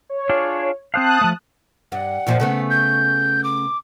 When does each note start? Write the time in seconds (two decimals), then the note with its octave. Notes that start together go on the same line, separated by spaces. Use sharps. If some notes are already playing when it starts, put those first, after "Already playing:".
0.09 C#5
0.29 D4 F4 G#4
0.94 C4 C5 F5 A5 D#6 F#6
1.21 F3 A3
1.92 G2 F#5
2.27 F#2 A#2 F3
2.40 C#3 A3 B3
2.70 G6
3.44 D6